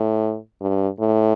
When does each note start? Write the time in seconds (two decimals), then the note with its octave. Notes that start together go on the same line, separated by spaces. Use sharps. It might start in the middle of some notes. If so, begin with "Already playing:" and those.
Already playing: A2
0.61 G2
1.00 A2